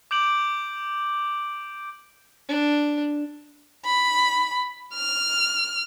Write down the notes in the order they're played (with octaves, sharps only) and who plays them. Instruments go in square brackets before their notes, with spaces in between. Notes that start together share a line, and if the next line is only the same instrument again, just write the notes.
[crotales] D6 G6 D7 F#7
[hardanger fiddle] D4
[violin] B5
F6